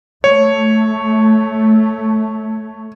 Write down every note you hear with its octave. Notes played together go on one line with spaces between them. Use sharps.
A3 C#5